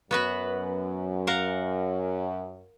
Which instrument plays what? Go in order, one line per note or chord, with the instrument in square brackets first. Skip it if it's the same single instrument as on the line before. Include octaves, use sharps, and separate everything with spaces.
[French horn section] F#2 [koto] B3 F#4 B4
[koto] A#4 F5 F#5